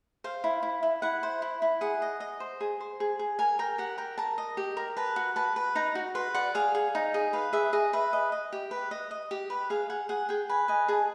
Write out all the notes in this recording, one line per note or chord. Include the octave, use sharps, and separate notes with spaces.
C5 F5
E4
E4
E4
E4 F#5
C5
E4
E4
G#4 F#5
D#5
D#5
C5
G#4
C5
G#4
G#4
A#4 G#5
A#4 G5
G4 F#5
A#4 G5
A#4 A5
D#5
G4
A#4
B4 A5
F#4
B4 A5
B4
D#4 A#5
F#4
B4 C6
D5 F#5
G#4 F5
G#4
D#4
G#4
B4 F5
G#4 E5
G#4 D#5
B4 E5
D#5
D#5
G4
B4
D#5
D#5
G4
B4
G#4 F5
G#4 F#5
G#4 F#5
G#4 G5
B4 G#5
D#5 G#5
G#4 A5